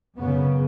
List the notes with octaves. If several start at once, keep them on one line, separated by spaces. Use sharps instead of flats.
F#2 C#3 B3